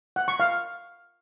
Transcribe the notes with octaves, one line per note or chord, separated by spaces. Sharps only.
F#5
C#6
F5